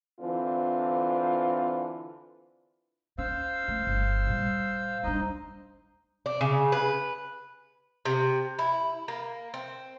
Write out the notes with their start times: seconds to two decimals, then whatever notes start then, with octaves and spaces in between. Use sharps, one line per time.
0.20 D3 E3 C4 F4
3.18 C#4 C5 F5 E6
3.68 A3
3.87 G1
4.27 A#2 G3
5.03 G3 D4 D#4 C5 D#5
6.26 D4
6.41 C#3
6.72 B4
8.05 C3
8.59 E4
9.08 A#3
9.54 C4